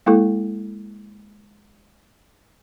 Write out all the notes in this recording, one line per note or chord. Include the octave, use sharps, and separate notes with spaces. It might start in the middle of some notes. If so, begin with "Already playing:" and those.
G#3 A#3 E4 A4